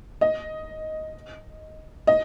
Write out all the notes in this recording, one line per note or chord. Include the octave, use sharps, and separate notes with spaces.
D#5
D#5